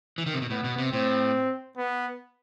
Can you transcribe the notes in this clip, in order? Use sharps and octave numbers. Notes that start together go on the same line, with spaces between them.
E3
D#3
C3
B2
A2 B3
B2
C3
A2 C4
B3